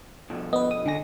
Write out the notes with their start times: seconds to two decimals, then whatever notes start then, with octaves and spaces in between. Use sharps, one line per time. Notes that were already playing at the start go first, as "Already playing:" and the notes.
0.30 B2 D3 F3
0.53 B3 B4 D#5
0.71 D#6
0.86 C#2 D3 G#5 A#6